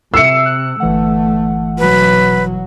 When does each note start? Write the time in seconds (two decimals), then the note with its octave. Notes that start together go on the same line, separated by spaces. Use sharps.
0.14 C3 E5 E6 C7 C#7
0.46 F#6
0.80 G1 E3 A3 F#5
1.79 B2 F#3 B4